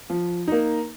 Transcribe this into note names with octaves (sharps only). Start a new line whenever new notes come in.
F3
A#3 D#4